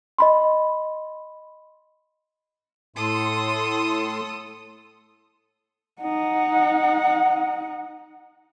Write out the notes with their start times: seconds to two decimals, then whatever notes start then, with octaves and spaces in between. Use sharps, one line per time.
0.18 D#5 B5 C6
2.96 A2 A4 C6 D#6
6.02 D#4 F#5